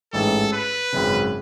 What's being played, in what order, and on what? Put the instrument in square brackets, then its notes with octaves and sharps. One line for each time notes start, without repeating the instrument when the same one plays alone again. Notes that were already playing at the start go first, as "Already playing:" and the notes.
[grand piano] A1 G#2 E3 [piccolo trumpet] A4
[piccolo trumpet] B4
[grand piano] G#1 F#2 C#3